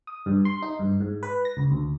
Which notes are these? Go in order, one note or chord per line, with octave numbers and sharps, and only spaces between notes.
D#6
G2
C6
D#4
G2
G#2
B4
A#6
C#2
D2